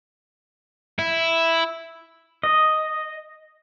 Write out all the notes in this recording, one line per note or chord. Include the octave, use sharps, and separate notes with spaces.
E4
D#5